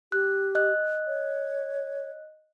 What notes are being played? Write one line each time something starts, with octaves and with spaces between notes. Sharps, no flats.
G4 F#6
D#5 F#6
C#5